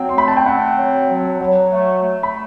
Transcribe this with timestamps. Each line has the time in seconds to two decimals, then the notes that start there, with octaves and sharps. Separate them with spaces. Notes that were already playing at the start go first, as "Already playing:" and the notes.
Already playing: F#3 C4 G5
0.09 C6
0.15 A3 B5
0.28 A5
0.37 G5
0.46 C4 F#5
0.78 F#3
1.09 F#3
1.40 F#3
1.71 A3
2.03 A3
2.23 B5